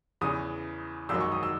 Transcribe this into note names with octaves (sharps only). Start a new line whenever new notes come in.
E2 C#3 E3 D#6
G#1 F#2 D#3 F#3 E6
C#6
D#6
E6